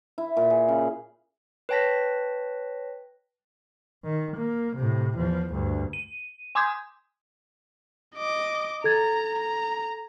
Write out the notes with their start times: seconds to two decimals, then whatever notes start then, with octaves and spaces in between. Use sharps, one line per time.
0.18 E4
0.37 A#2
0.50 G#4
0.68 C#3
1.69 B4 C#5 G5 A5 A#6 B6
4.04 D#3
4.37 A#3
4.77 A2 C3
5.17 E2 F3
5.51 D2 G2
5.93 D#7
6.55 G#5 C6 D6 D#6 G6 G#6
8.16 D#5 D6
8.84 A4 A#5 G#6 A6
9.39 A#5